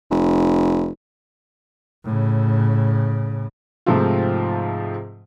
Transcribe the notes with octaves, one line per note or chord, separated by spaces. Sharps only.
F1
A2 C#3
G#2 C3 F3 A3 C4 F4